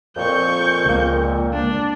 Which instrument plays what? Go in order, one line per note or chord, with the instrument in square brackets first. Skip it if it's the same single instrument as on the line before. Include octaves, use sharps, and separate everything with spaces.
[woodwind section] F2 A#2 [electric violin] C#6 G6
[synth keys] C#2 A#3
[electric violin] D4